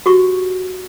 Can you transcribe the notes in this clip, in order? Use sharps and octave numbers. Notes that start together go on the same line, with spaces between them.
F#4 G4 C#6